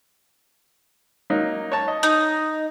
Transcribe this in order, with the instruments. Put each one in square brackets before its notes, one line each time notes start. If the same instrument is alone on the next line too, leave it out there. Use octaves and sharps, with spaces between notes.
[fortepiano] F#3 A#3 D#4
C#5 A5
D#5
[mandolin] D#4